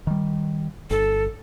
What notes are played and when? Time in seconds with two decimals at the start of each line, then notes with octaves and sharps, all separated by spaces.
0.07 D#3 G3
0.90 G1 A4